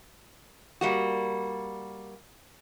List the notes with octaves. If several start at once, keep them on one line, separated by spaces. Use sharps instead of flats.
G3 A#3 F#4